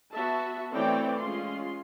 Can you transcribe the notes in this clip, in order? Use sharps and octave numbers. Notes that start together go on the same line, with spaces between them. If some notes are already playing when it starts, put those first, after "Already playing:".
B3 F#4 E5 A5
E3 A3 C4 C#5 D5 G5
G#3 C#4 F4 C6